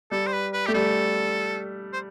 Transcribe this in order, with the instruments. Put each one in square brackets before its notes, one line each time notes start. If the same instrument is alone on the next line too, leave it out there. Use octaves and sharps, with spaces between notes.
[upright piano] G3 [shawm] A4
[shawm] C5
B4
B4
[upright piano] A3 [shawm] G4
[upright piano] G3 [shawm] A4
[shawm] C5